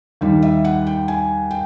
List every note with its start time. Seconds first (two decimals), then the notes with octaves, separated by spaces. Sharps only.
0.21 D#2 D#3 G3
0.42 E5
0.65 F#5
0.87 G5
1.08 G#5
1.51 G5